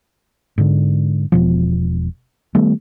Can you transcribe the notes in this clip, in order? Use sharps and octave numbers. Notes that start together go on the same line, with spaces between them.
G#2 D3
E1 B2 F3
D#3 G3 A3 B3